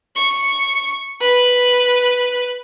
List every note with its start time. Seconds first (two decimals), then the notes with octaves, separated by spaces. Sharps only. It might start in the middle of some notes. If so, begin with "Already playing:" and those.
0.16 C#6
1.21 B4